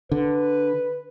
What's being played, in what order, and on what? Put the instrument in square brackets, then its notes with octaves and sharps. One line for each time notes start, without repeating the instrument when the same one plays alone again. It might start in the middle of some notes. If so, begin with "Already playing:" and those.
[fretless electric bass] D3 [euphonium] B4